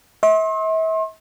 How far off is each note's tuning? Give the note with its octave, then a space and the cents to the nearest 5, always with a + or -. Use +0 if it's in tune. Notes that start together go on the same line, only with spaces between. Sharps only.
E5 -40 C6 +40